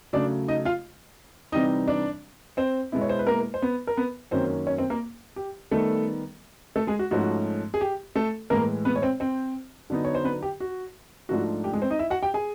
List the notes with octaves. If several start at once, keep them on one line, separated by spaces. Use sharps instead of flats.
C#3 F#3 A3 D4 D5
D#4 D#5
F4 F5
C3 E3 G3 C4 D#4 D#5
D4 D5
C4 C5
B2 G#3 B3 E4
C#5
C5
B4
A#3 A#4
C5
B3 B4
A#4
B3 B4
F#2 D#3 F#3 A#3 C4 C#4 C5
C#4 C#5
C4 C5
A#3 A#4
G4
D#3 G3 A3 B3 D#4 A4
A3 A4
G#3 G#4
F#4
G#2 F3 A3 C#4 F#4
G#4
G4
A3 A4
A2 E3 G#3 A#3 A#4
B3 B4
C#5
C4 C5
C4 C5
D3 F#3 B3 D#4
C#5
C5
B3 B4
G4
F#4
G#2 F3 A3 D4 F4 F#4
G4
G#3 G#4
C4 C5
D#4 D#5
E4 E5
F#4 F#5
G4 G5
G#4 G#5